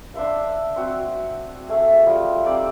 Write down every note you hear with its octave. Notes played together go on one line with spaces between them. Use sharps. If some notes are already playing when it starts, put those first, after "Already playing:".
D4 C5 E5 F5
C4 F#4
A3 G#4
F3 G3
C4 D#4 D5 E6